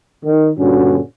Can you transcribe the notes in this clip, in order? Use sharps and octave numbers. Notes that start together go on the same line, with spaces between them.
D#3
G2 A#2 D3 C#4 F#4